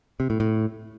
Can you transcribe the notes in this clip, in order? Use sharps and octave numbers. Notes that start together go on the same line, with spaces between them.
C3
A2
A2